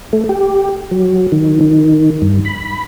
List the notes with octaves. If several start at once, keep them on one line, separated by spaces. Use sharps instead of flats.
A3
G4
F#3
D#3
D#3
G2
B5